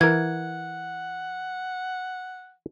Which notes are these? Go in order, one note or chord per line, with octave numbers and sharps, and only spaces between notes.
E3 A#4 F#5 G#6